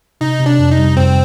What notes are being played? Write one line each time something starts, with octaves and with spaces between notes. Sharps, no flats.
C3 D#4
C3
D4
F2
D#4
G3
F2 C4